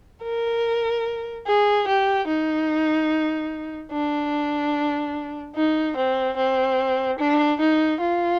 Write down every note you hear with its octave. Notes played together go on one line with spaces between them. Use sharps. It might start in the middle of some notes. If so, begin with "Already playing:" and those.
A#4
G#4
G4
D#4
D4
D#4
C4
C4
D4
D#4
F4